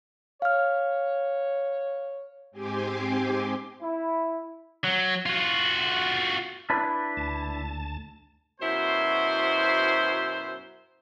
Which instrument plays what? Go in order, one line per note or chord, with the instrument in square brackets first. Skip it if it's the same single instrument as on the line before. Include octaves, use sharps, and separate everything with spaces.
[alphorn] C#5 [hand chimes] F5 F6
[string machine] G#2 C4 G4 G#5 C6 D6
[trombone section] E4
[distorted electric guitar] F#3
F4 F#4
[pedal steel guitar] D4 E4 B4
[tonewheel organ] D2 A5
[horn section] F#2 B2 E4 C5